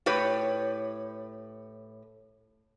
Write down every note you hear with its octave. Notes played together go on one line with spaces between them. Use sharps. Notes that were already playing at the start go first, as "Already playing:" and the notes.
A2 G4 B4 C#5